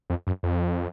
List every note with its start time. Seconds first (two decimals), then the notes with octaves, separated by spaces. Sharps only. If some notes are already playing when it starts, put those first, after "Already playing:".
0.10 F2
0.27 F#2
0.43 F2